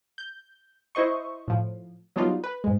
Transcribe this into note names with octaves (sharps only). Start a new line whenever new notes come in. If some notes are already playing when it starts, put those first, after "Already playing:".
G6
E4 C5 D#5 C#6
A2 F3
F#3 G3 B3 D4 D#4 F4
B4
G#2 G#3